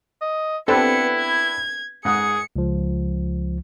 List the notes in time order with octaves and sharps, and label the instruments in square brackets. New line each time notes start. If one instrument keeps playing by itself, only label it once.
[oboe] D#5
[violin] B3 C#7 [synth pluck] C4 A4 [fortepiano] D4 G4 B4 [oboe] E4
[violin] G#6
[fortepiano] G#2 F#5 D#6 [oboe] G#4 [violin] C#7
[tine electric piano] C#2 F3